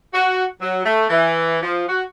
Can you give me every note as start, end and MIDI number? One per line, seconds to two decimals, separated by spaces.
0.12 0.43 66
0.60 0.80 54
0.84 1.05 57
1.10 1.58 52
1.62 1.83 53
1.88 2.01 66